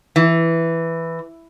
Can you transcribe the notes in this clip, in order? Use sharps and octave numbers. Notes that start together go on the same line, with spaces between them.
E3